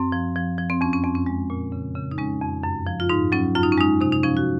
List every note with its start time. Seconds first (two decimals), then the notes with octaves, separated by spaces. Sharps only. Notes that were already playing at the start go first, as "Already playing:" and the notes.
Already playing: F#2 C4
0.12 F3
0.36 F3
0.58 F3
0.70 C4
0.81 F2 C#4
0.93 C#4
1.03 F2 C4
1.15 C#4
1.26 G#3
1.50 A#2
1.72 C#3
1.95 C#3
2.11 D#4
2.18 G#3 C#4
2.41 F2
2.64 F#2
2.87 F3
3.00 F4
3.10 G#2 D#4
3.32 F#3 C#4
3.55 F#2 F4
3.63 D#4
3.72 C#4
3.78 G#3 D#4
4.01 C3 D#4
4.12 D#4
4.23 F3 C#4
4.37 F#4